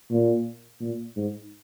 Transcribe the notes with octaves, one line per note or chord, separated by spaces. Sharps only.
A#2
A#2
G#2